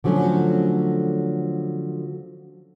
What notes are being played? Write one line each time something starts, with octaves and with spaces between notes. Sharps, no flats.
D3 F3 F#3 A3 C#4